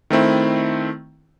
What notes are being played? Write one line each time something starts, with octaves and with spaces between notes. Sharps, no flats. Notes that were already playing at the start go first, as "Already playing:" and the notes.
D#3 A3 C4 E4